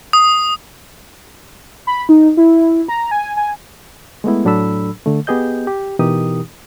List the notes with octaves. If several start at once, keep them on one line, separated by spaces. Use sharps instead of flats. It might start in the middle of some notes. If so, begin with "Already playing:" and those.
D#6
B5
D#4
E4
A#5
G#5
G#5
G#3 A3 B3 E4
A2 F#3 D4 A4 B5 E6
D3 A3
B3 G4 G#4 D#5 G6
G4
B2 E3 D#4 G4 A#4 D#6